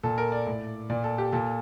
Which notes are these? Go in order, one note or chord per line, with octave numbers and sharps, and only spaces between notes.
A#2 A4
A#4
D5
A2
A#2 D5
A4
G4
A#2 A4